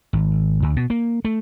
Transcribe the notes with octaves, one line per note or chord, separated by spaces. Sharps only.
G#1
D2
B2
A#3
A3